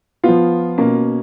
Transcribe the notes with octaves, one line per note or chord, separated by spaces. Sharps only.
F3 B3 F4
B2 A#3 C#4